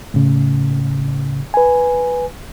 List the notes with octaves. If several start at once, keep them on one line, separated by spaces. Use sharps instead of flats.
A2 C#3
B4 G#5